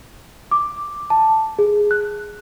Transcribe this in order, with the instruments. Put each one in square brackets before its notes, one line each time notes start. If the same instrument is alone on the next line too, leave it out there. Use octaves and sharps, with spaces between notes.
[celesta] D6
A5
G#4
F#6